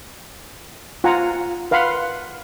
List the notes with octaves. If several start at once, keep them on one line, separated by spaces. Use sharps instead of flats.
F4 F#5 G#5 A#5
B4 F5 F#5 B5 C6